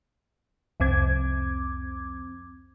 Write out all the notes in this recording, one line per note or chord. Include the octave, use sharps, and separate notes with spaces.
C2 F2 C4 D6 G#6